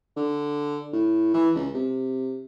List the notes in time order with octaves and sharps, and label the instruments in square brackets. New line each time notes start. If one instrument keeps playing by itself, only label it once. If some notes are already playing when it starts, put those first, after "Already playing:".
[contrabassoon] D3
A2
E3
C#2
C3